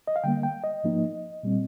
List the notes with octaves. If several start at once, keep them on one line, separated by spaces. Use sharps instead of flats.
D#5
F5
D3 G3 A#3 G5
G5
D#5
G#2 F3 A#3 D#4
A#2 G3 C4